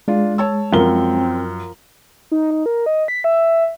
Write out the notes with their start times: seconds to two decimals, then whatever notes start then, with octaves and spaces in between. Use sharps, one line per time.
0.08 G#3 D4 F4
0.38 C#5 A5 E6
0.73 F#2 F3 C4 A#4 G7
2.31 D#4
2.51 D#4
2.66 A#4
2.86 D#5
3.08 B6
3.24 E5